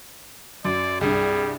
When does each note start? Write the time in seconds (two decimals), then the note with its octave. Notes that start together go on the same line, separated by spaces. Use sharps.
0.65 F#2 D5
1.01 C2 G2 G3 G#4